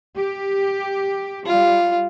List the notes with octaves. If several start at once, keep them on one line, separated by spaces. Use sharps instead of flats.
G4
G3 F4